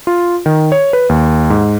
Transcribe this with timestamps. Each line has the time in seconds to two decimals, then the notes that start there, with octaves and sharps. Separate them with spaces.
0.07 F4
0.46 D#3
0.72 C#5
0.93 B4
1.09 D#2
1.50 G#2